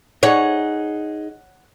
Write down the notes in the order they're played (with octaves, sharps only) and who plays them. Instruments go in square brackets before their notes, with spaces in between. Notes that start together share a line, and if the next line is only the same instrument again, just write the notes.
[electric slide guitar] D#4 G#4 [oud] C#5 [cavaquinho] F#5